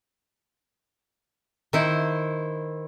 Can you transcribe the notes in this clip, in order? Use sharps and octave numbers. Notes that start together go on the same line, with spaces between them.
D#3 E4 C5